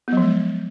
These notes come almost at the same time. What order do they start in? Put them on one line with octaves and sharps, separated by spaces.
B3 F#3 F3 G#3